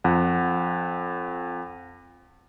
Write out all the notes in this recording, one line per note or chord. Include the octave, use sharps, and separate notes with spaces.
F2 F#5